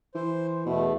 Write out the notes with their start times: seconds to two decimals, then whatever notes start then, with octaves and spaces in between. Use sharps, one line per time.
0.15 E3 C5
0.66 E2 B2 A3